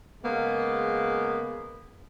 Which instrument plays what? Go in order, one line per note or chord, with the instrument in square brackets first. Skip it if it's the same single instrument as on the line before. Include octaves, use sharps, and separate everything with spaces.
[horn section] C#3 G#3 A#3 B3